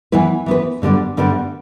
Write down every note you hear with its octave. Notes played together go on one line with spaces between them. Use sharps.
E3 B3 E4 B4
E3 B3 E4 B4
G2 D3 G3 B3 D4
G2 D3 G3 B3 D4